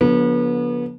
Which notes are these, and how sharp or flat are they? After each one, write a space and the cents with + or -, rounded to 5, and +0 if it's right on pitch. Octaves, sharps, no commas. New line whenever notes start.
D3 -25 F3 +40 B3 -35